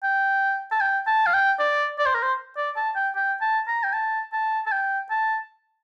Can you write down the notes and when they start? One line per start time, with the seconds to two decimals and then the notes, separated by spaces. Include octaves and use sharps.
0.03 G5
0.71 A5
0.81 G5
1.07 A5
1.27 F5
1.34 G5
1.59 D5
1.99 D5
2.06 C5
2.15 A#4
2.23 C5
2.57 D5
2.76 A5
2.96 G5
3.16 G5
3.42 A5
3.68 A#5
3.84 G5
3.93 A5
4.33 A5
4.66 A5
4.72 G5
5.10 A5